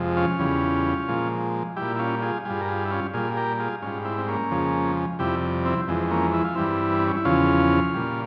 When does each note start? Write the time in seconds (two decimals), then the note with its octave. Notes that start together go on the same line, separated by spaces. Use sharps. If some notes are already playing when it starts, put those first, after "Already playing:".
Already playing: F2 C3 F3 G#3
0.17 C#4 F4
0.39 E2 C#3 G3
1.08 A#2 F3 G#3
1.76 A#2 G3 E4 G4
1.95 E4
1.99 C#4 F4
2.22 F4 G#4
2.45 G2 G3 F4 G#4
2.61 A#4
2.68 F4 G#4
2.85 E4
2.91 C#4 F4
3.14 A#2 G3 F4 G#4
3.32 G#4
3.37 G4 A#4
3.60 F4 G#4
3.82 G#2 G3 C#4 F4
4.05 C4 E4
4.18 C4
4.28 A#3 C#4
4.51 F2 C#3 F3 G#3
5.19 F2 C3 G3 E4 G4
5.65 C4 E4
5.88 F2 E3 G#3 C4
6.11 A#3 C#4
6.34 E4
6.44 F4
6.55 G2 E3 G3 C4 E4
6.99 C4
7.07 C#4
7.17 E4
7.25 E2 C#3 F3 C#4 F4
7.94 A#2 G3